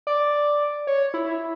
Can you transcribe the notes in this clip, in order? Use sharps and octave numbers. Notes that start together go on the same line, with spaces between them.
D5
C#5
E4